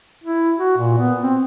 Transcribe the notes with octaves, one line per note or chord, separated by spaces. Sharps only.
E4
F#4
A#2
B3
C4